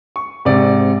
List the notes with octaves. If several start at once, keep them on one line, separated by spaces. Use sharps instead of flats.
C#6
G#2 C3 D5